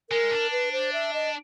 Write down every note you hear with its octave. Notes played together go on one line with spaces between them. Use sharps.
G#3 A#4
D4
B4
C5
E5
D#5